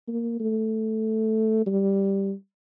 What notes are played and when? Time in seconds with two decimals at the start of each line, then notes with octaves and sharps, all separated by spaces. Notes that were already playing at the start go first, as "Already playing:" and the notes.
0.08 A#3
0.40 A3
1.66 G3